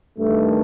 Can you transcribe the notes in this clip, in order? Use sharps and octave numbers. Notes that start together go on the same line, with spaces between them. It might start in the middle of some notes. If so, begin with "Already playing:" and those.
G2 D#3 A3